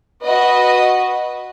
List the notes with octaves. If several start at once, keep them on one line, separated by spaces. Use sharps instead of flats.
F#4 B4 D#5